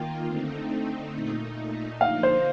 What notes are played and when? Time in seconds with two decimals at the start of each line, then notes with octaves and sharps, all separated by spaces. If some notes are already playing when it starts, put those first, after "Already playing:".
Already playing: D#3 A#3 F4 G5
0.26 D3 A3 C4 D#4
1.14 A#2 A3 D#4
2.01 D3 F3 A#3 D#4 F5
2.23 C5